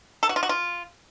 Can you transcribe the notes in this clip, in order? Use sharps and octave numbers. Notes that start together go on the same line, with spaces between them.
A4
F#4
F4
F#4
F4